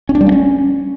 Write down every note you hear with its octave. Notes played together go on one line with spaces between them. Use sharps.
C#4
D4
G3
A#3
C#4